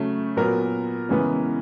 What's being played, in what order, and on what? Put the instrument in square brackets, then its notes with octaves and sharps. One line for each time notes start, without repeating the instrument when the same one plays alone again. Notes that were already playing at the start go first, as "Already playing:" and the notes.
Already playing: [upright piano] C#3 F#3 A3
A#2 F#3 B3 A#4
C#3 E3 G#3 B3